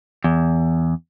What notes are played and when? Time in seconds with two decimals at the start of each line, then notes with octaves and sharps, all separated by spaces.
0.24 E2